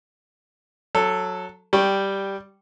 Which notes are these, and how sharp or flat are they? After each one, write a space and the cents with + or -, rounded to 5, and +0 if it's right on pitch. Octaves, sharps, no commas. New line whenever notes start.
F#3 -10 A4 +0
G3 +0 G5 -5 C#6 -15